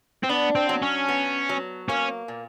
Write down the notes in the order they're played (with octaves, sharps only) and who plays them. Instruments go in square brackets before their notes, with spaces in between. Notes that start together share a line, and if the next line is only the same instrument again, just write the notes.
[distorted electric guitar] C4
[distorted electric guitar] B3 [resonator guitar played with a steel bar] D4
[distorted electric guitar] C4
[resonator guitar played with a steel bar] F#3
[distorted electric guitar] C#4
[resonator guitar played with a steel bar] B3
F#3
[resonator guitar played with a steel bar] A#3 [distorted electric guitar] C#4
[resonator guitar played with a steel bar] A#2